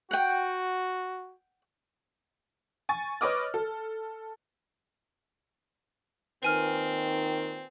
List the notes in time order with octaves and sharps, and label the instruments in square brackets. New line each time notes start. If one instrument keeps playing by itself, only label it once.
[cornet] F#4 [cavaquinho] F#5 G5
[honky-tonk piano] G#5 C#6 A6
B4 C#5 D#5 D6 D#6 F6
A4
[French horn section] A#2 D#3 [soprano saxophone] C4 [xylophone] B4 G#5 F6